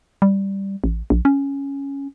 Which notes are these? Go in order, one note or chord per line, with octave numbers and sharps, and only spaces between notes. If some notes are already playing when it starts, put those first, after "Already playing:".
G3
A1
A#1
C#4